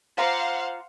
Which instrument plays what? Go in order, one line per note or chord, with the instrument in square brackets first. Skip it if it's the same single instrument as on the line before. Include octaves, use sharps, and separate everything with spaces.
[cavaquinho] F4 A#5 D6 [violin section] C5 F5 F#5